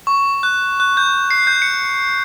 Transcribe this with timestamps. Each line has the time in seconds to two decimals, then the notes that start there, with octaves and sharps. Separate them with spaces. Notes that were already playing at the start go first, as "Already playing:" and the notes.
0.07 C#6
0.43 F#6
0.80 F#6
0.97 G6
1.31 C7
1.47 G6
1.62 C#7